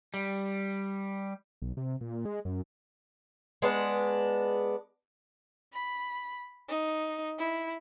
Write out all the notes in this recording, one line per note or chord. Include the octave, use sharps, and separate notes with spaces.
G3
B1
C3
A#2
G#3
F#2
G#3 B3 D4
B5
D#4
E4